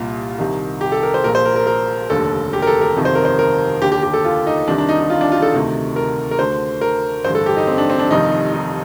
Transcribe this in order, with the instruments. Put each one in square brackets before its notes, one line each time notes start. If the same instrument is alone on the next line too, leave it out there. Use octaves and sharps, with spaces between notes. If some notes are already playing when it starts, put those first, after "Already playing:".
Already playing: [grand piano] C2 A#2 F4
C2 C3 D#3
G4
A4
A#4
C5
A#1 A#2 A#4
C5
A#4
A#4
A#4
F1 D#2 D3 A4
G4
A#4
A4
A#4
G1 F2 C3 D#3
C5
A#4
C5
A#4
D#2 D3 G4
G4
G4
A4
F4
D#4
C2 C3 D#3 D4
D4
D#4
D#4
F4
D4
F4
A4
D2 C3 D#3
A#4
A#4
D2 D3 C5
A#4
A1 G2 D3 C5
A4
G4
D#4
C4
D4
C4
D4
F1 F2 C3 D#3 D#4
D#4